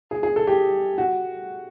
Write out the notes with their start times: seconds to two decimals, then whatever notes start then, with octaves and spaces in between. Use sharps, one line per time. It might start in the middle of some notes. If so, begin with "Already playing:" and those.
0.11 G#4
0.23 G#4
0.36 A4
0.47 G4
0.98 F#4